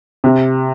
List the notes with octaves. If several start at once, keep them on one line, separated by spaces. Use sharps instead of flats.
C3